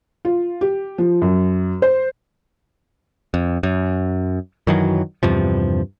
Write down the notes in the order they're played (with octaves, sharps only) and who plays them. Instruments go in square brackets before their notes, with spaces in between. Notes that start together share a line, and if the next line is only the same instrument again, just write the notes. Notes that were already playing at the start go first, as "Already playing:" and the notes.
[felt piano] F4
G4
F3
F#2
C5
[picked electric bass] F2
F#2
F#2 D#3 E3 F#3
E2 G2 C3 F3